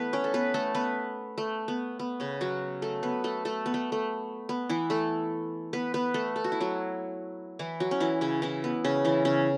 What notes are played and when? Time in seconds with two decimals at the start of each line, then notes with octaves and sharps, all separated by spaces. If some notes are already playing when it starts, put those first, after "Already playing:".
Already playing: E3 A3 B3 B4
0.13 C#4 C#5
0.24 A4
0.34 B3 B4
0.54 A3 A4
0.75 B3 B4
1.38 A3
1.68 B3
1.99 B3
2.20 C#3 C#4
2.41 F#3 F#4
2.82 A3 A4
3.03 B3 B4
3.24 A3 A4
3.45 A3 A4
3.66 B3
3.74 A3
3.92 A3
4.49 B3
4.69 E3 E4
4.90 A3 A4
5.73 B3 B4
5.94 B3 B4
6.14 A3 A4
6.36 A4
6.44 F#4
6.52 E4
6.60 F#3 F#4
7.59 E3 E4
7.80 F#3 F#4
7.91 C#4
8.00 E3 E4
8.21 C#3 C#4
8.42 E3 E4
8.64 B3
8.85 C#3 C#4
9.05 E3 E4
9.25 C#3 C#4